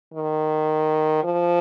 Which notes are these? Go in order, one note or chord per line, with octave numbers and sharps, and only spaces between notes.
D#3
F3